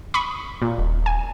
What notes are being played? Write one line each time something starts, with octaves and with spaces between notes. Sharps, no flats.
B5 C#6 D#6
A#2
D#1
G#5